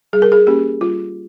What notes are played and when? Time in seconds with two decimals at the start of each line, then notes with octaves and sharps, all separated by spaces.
0.13 G3 G#4
0.22 A#4
0.32 G#4
0.47 A#3 C#4 G4
0.81 G3 F4